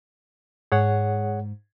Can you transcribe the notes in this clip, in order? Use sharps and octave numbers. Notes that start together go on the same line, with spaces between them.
G#2 G#4 C#5 F#5